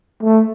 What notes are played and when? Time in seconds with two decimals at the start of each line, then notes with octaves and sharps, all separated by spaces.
0.23 A3